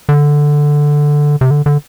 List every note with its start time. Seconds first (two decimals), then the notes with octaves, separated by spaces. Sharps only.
0.09 D3
1.41 C3
1.51 D3
1.66 D3